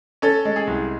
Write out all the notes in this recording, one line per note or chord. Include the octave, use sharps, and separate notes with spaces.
C#4 A4
G#3
G#4
C2